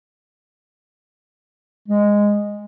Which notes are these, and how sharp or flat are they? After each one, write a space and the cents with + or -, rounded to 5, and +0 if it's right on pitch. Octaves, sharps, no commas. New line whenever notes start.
G#3 -10